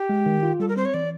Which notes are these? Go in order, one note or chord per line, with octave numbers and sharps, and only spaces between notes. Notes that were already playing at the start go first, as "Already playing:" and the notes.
Already playing: G4
G#3
D#3
F4
G3 A4
A#4
C4 C5
C#5
E3 D5